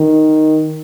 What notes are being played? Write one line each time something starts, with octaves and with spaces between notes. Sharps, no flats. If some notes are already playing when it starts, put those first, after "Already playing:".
Already playing: D#3